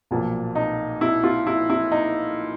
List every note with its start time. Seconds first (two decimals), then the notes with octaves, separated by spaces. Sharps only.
0.11 B1 A#2 F3
0.55 D#4
1.01 E4
1.23 F4
1.47 E4
1.70 E4
1.92 D#4